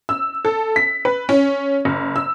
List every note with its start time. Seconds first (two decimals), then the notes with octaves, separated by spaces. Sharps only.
0.09 E6
0.45 A4
0.76 B6
1.05 B4
1.29 C#4
1.85 F#1
2.16 E6